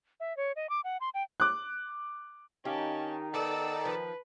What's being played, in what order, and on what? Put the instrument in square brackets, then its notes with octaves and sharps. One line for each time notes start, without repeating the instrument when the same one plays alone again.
[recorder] E5
C#5
D#5
D6
F#5
C6
G5
[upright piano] D6 F#6
[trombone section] D#3 D#4 [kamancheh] C#4 A5 [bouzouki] G4 F5
[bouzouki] B3 [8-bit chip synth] A4 D5 A5 [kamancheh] E6
[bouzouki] F3 [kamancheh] B4